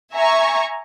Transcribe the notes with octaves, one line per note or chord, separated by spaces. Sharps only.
E5 G#5 A#5 C#6